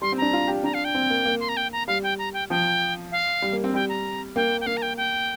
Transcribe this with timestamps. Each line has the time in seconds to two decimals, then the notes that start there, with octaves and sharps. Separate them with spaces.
0.01 G3 C6
0.12 C4
0.18 D4 A#5
0.33 F4
0.48 G4
0.64 D4 A#5
0.74 F5
0.85 G5
0.95 C4
1.10 A#3
1.26 A#3
1.40 C6
1.49 A#5
1.57 G5
1.73 A#5
1.87 G3 F5
2.03 G5
2.18 A#5
2.34 G5
2.50 F3 G5
3.12 F5
3.42 G3
3.53 A#3
3.64 C4
3.74 G3 G5
3.89 A#5
4.36 A#3 G5
4.61 G5
4.66 A#3 F5
4.77 A#5
4.82 G5
4.97 G5